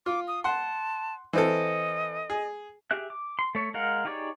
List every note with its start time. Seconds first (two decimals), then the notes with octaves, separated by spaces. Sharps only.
0.06 F4 D6
0.28 D#6
0.44 F#5 A5 C6
1.33 E3 C4 A4 D#5
2.30 G#4
2.91 G4 G#4 E5 F#6
3.10 D6
3.39 C6
3.55 A3 C#5
3.74 G#3 A#4 F5 F#5
4.05 D#4 G4 G#4 C#5 D5